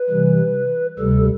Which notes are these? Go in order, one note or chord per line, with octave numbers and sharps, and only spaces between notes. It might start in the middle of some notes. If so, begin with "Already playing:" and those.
Already playing: B4
C3 E3 G3
D2 C3 G3 A4